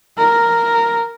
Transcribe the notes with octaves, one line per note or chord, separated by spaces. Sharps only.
A#4